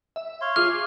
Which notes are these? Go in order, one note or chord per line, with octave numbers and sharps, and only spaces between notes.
E5
C#5 F5 C6
F4 G#4 D6 F6